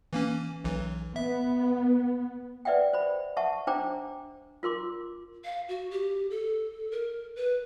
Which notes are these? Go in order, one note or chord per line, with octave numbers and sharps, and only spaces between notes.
E3 A#3 C#4
B1 E3
B3 E5
B4 D5 E5 F#5 G5
C5 B5
E5 F#5 A5 C#6
D4 C5 G5 A#5 D6
F4 A#4 C6 D6
F5
F#4
G4
A4
A#4
B4